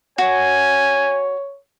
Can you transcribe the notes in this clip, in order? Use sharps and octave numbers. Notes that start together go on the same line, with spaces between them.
F#4 C#5 G#5